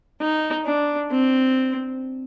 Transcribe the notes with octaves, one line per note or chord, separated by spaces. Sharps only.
D#4
D4
C4